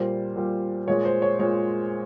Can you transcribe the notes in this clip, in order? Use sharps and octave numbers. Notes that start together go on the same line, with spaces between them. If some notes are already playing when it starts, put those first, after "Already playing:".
Already playing: A#2 G3 C5
A#2 G3
A#2 G#3 C#5
C5
C#5
A#2 G#3 C#5